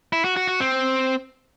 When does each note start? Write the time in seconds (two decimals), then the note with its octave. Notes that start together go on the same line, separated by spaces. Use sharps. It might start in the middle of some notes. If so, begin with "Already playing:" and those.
0.13 E4
0.25 F#4
0.36 F#4
0.48 F#4
0.60 C4